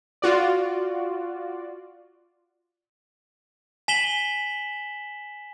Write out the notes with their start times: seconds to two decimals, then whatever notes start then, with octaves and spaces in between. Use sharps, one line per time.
0.22 F4 F#4 D5
3.88 G#5 B6 E7 F#7 G7